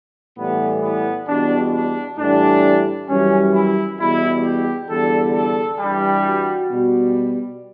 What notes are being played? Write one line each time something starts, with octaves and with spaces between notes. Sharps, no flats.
A2 E3 G3 B3
B3
E2 B2 G3 D4
D4
A2 E3 G3 D4
F#2 E3 G3 C#4
E4
E2 B2 G3 E4
G4
E2 D3 G3 A4
A4
G2 E3 G3
F#4
B2 G3